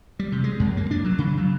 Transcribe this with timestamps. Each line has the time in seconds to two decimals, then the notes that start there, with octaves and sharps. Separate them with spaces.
0.19 G3
0.32 C3
0.44 G#3
0.60 F#2
0.77 A#3
0.91 D4
1.05 F#3
1.18 C#3
1.38 F#3